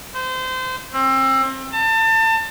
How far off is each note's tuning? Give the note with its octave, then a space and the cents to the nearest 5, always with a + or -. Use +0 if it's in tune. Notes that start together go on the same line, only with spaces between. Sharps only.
C5 -30
C4 +30
A5 +30